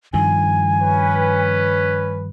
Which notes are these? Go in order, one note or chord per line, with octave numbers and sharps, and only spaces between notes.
G2 D#3 F3 G#5
C#4 B4